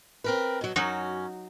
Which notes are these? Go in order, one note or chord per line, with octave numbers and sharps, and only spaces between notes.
C4 A#4 B4
B2 F#3
F#2 F#3 C#4 D#4 F#4